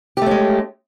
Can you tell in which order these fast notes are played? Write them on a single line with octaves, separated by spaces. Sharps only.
G4 A3 C#4 G#3